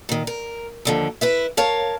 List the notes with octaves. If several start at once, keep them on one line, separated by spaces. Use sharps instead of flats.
A#2 D#3
A#4
D#2 D3 F3
E4 B4 E5
A#4 C#5 F5 A5